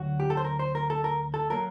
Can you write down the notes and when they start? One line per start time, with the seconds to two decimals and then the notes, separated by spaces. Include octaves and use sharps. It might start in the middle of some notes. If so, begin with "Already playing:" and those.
Already playing: D2 D3 F#3 F#4
0.20 G4
0.30 A4
0.37 C5
0.45 A#4
0.59 C5
0.75 A#4
0.90 A4
1.04 A#4
1.34 A4
1.50 F#3 A#3 A#4